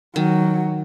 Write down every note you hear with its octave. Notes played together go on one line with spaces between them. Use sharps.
D#3 F#3